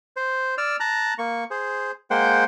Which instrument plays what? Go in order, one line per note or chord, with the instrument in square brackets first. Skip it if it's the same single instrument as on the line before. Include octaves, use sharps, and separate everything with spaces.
[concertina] C5
D5 E6 F6
A5 A#5 F#6
A#3 C#6
G#4 C5
G#3 A#3 C5 F#5 G5